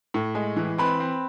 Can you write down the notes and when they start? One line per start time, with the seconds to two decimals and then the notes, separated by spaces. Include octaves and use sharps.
0.14 A2
0.35 G#3
0.56 E3
0.78 C4 B4 B5
1.00 C4